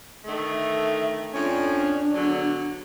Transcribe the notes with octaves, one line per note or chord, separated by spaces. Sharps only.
D3 D#3 A3
E5
F2 C#4 D4
E2 D3 F#3